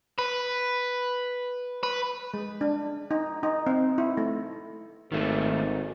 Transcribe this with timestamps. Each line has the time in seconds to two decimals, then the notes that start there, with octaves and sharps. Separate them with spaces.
0.19 B4
1.83 B4
2.34 G#3
2.61 D4
3.11 D#4
3.43 D#4
3.67 C4
3.98 E4
4.17 A3
5.12 G#1 D#3 A3